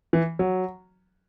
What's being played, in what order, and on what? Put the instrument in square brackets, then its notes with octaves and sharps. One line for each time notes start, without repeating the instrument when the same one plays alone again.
[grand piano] E3
F#3